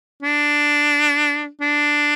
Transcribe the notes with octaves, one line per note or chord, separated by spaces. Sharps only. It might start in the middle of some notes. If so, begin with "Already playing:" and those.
D4
D4